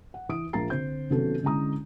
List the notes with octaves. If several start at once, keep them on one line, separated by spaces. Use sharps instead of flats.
F#5
E3 D#6 D7
A#1 F3 A#3 A#5 A6 C7
D3 C4 C5 G6
C3 D#3 F#3 B3 C#4 A4
D3 G#3 C#4 E4 A#5 D#6